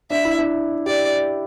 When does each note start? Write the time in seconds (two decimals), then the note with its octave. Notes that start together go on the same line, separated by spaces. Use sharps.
0.10 D4 E5
0.25 E4
0.39 D4
0.86 G4 D5